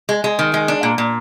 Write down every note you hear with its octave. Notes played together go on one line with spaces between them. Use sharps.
G#3
G#3
D#3
G#3
D4
A#2
A#2